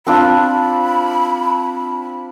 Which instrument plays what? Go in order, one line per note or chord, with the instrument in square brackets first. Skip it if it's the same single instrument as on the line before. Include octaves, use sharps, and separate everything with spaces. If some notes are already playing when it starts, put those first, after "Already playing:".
[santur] C4 D4 F4 [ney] B5